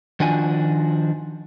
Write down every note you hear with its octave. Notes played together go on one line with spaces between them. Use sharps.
D#3 F3 D4 F#4 G#5